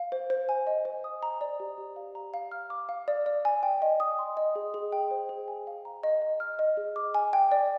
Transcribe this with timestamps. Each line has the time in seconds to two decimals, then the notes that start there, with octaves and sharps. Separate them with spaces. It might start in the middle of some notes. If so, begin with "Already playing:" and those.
Already playing: F5
0.12 C5
0.30 C5
0.49 G#5
0.67 D#5
0.85 C5
1.04 D#6
1.23 A#5
1.41 D5
1.60 G4
1.78 G4
1.96 F5
2.15 A#5
2.34 F5
2.52 F6
2.70 D6
2.89 F5
3.08 D5
3.26 D5
3.45 G#5
3.63 G5
3.82 D#5
4.00 D#6
4.19 C6
4.37 D#5
4.55 G#4
4.74 G#4
4.92 G5
5.11 C5
5.29 G#4
5.48 G#5
5.67 F5
5.85 A#5
6.03 D#5
6.22 D#5
6.40 F6
6.59 D#5
6.77 G#4
6.96 D6
7.14 G#5
7.33 G5
7.52 D5